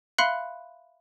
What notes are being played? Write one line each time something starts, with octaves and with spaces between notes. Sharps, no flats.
E5 F5 B5 C6 F#6 C#7